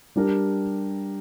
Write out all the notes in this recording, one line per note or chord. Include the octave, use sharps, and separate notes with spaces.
G3 D4 G4 A#4